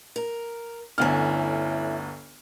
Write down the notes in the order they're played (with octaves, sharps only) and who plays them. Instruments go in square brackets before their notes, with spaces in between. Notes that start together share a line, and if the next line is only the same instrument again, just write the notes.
[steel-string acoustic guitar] A#4
[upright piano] G1 D2 F6 [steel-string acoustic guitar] C#4 E4